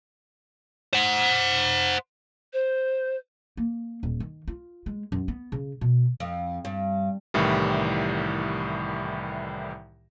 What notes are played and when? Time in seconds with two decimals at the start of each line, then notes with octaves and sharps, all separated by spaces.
0.93 C5 F#5
2.53 C5
3.57 A#3
4.03 D#1
4.20 D#3
4.48 F4
4.86 G#3
5.12 F#2
5.28 B3
5.52 C#3
5.81 B2
6.20 F2
6.65 G2
7.34 C2 A2 D#3 E3 G3